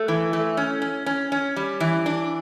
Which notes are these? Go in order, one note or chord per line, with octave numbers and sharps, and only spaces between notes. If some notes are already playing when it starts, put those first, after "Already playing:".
Already playing: A3
E3
A3
C#4
C#4
C#4
C#4
G3
E3
D4